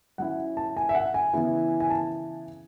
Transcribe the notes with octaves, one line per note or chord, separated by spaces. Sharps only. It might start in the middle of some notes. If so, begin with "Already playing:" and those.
F#3 C#4 E4 F#5
A5
G#5
E5
F#5
G#5
C#3 E3 B3 E4
G#5
A5